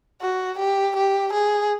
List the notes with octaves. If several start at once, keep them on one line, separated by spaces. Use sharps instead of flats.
F#4
G4
G4
G#4